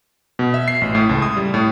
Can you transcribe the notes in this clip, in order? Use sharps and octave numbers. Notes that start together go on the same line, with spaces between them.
B2
E5
C7
A1
A2
C#2
D#6
G3
A2